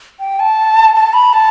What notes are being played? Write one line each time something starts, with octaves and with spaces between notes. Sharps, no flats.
G5
A5
A5
B5
A5